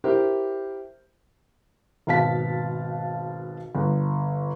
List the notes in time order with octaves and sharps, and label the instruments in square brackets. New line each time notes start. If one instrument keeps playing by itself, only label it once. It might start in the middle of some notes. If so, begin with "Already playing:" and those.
[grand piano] E4 G4 A#4 C5 E5
[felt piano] G#1 B2 F5 A5 B6
G1